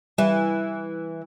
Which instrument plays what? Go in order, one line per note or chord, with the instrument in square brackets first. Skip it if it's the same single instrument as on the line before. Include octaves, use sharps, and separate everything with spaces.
[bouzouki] E3 E4 [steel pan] G3 F5